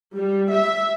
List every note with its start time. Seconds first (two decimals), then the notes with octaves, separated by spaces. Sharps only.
0.15 G3
0.54 E5